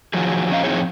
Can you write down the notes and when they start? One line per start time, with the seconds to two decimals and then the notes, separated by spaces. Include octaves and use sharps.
0.14 D#3 F3 F#3 G#4
0.51 E2 C#4 D#5 F5 A#5
0.63 F3 C4 D#4 E4 G#4 C#5